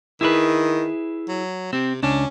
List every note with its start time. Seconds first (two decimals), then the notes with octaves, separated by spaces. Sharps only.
0.21 D#3 E4 G#4 B4
1.29 F#3
1.73 C3 C4
2.03 C#2 C#4 D4